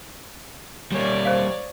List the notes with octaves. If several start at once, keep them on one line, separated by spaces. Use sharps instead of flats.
G3 A#3 C#5 D5
C5 F5